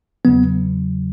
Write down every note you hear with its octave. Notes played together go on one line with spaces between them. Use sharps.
E2 C#3 F#3 B3